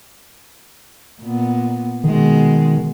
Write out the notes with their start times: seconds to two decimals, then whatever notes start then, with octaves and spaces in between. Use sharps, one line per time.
1.21 A#2 B3
2.04 B2 D#3 G#3